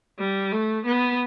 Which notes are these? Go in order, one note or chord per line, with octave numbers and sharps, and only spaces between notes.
G3
A3
B3